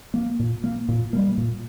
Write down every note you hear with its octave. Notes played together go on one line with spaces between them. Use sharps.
A#3
A#2
A#3
A#2
G3 A#3
A#2